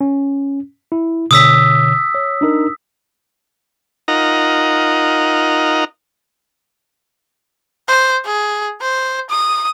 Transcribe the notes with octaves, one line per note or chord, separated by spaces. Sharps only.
C#4
E4
B2 D3 C#5 D#6 E6 B6
C#5
D4 D#4 A#4
D#4 F4 A#4 D#5 F#5 A#5
C5
G#4
C5
D#6